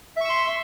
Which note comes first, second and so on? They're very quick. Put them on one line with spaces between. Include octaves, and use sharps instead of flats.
E5 C#6 E6 C6